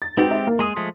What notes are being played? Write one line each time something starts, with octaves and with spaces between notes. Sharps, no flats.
A6
G#3 C4 D#4 F#4 G4 B4
E5
A#3
G#3 G#4 C6 D#6
F3 G#3 A3